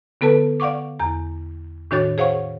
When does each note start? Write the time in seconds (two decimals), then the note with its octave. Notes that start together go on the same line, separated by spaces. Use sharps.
0.21 D3 B3 A4 B4 A5
0.60 D5 F5 F#5 C#6 D6
1.00 E2 A#5
1.91 A2 D#3 D4 F#4 C#5 A6
2.18 G#4 C5 C#5 F5 F#5 C#6